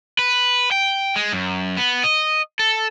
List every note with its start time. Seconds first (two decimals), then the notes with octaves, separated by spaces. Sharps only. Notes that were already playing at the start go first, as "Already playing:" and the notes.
0.19 B4
0.71 G5
1.16 G#3
1.33 F#2
1.77 B3
2.04 D#5
2.59 A4